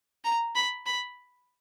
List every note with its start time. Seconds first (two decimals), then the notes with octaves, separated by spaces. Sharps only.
0.24 A#5
0.55 B5
0.86 B5